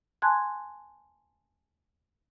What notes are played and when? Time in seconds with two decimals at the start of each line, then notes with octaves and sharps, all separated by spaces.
0.22 G#5 A5 C6 F#6 G#6